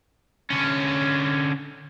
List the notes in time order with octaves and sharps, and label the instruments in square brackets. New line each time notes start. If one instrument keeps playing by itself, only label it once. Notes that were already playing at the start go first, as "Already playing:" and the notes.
[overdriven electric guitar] D3 C#4